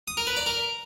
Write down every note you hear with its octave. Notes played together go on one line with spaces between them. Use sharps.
D#6
A#4
B4
D5
A#4